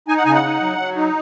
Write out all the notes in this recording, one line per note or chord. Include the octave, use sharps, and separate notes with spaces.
D#4 G#5
F#5
C#3 G#5
F#5
D#4
F#3
F#3
D#4